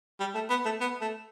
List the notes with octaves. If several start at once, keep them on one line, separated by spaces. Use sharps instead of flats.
G3
A3
B3
A3
B3
A3